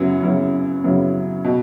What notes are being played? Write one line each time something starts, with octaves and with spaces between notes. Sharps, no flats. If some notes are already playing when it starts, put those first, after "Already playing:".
Already playing: F#2 C#3 F#3 B3 E4
F#2 C#3 F#3 B3 E4
F#2 C#3 F#3 B3 E4
B2